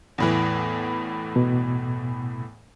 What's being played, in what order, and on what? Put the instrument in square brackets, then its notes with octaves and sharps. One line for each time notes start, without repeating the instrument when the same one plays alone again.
[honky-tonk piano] E2 A2 E3
[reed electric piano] B2